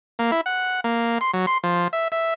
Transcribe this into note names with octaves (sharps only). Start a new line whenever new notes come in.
A#3
E4
F#5
A#3
C6
F#3
C6
F3
E5
E5